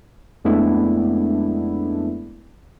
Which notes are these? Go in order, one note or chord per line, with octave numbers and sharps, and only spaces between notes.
F2 G#3 A3 B3 D4 E4